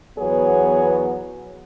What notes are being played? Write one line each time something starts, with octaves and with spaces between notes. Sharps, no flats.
E2 F#3 B3 G#4 B4 C#5